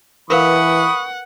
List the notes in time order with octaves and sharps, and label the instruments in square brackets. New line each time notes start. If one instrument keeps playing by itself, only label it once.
[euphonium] E3 [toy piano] A#4 B4 F5 [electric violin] F#5 [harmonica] B5 C#6 D#6